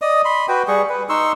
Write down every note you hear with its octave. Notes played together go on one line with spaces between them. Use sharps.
D5 D#5 D#6
B5 C6
F#4 B4 G5
G3 G#4 C#6
B4
D#4 C6 C#6 E6